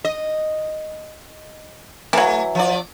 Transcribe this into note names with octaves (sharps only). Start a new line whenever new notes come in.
D#5
E3 F#3 A3
F3 D5